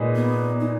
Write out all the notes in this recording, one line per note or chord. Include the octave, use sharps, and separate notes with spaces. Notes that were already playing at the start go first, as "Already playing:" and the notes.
Already playing: A#2 G#3 D#4 G#4 B4
B3
D#4